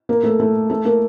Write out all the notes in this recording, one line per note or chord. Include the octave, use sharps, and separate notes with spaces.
A#3 A#4
A3 A4
A3 A4
A3 A4
A#3 A#4